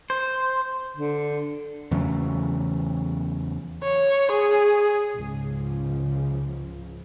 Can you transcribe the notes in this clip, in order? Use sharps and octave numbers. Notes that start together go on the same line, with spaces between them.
C5
D3
E2 C#3 F#3 A3
C#5
G#4
C#2 G#2 C#3 F3